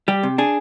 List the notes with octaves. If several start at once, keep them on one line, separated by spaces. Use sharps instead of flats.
G3 G4
C3
D4 G#4